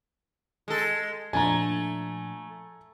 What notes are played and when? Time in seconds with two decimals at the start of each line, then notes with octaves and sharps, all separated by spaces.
0.68 G#3 A4
1.33 A#2 F3 A3 D4 G#5 A#5